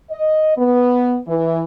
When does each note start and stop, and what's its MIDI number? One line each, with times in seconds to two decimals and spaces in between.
0.11 0.53 75
0.56 1.16 59
1.27 1.62 52